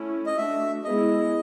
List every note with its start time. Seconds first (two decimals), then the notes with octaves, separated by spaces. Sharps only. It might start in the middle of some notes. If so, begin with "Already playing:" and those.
Already playing: A3 C#4 E4
0.26 D#5
0.37 A3 D4 F#4 E5
0.84 G#3 B3 E4 G#4 D#5